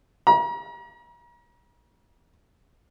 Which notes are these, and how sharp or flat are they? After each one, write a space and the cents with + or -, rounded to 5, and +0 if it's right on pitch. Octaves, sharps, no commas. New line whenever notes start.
A#5 +40